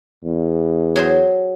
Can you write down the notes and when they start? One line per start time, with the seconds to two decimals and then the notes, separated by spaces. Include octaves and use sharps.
0.24 E2
0.96 F#3 G#4 C5